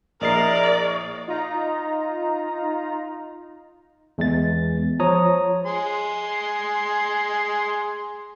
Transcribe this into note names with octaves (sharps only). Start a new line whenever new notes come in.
A#1 E4 G#4 A#4 D5 D#5 C7
D#4 F4 A#5
E2 G#3 A6
F3 C#5 A#5 D#6
G#4 C6